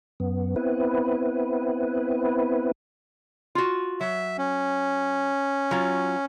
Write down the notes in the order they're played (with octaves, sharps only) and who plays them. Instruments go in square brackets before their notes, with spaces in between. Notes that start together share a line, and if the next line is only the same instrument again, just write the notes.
[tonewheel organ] F#2 B3
B3 C4 E4 B4
[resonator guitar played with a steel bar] F4 F#4
[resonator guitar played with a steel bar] F#3 [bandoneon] E5
[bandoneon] C#4
[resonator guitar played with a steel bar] F#3 F4